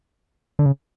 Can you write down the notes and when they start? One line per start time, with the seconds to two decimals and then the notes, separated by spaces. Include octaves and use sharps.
0.59 D3
0.66 C#3